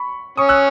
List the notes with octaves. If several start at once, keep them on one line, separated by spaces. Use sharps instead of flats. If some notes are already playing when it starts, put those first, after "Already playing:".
Already playing: B5 C#6
C#4 C#6 D#6
E6 F#6